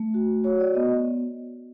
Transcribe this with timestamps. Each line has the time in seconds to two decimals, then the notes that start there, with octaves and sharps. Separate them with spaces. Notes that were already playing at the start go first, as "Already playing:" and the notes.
Already playing: A3
0.14 F#4
0.44 F#4 C#5
0.60 D5
0.75 B3 D#5